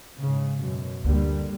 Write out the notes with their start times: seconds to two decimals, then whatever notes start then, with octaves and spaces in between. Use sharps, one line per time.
0.20 G#2 C#3
0.59 F#2 B2
1.04 D2 D3 G3 A#3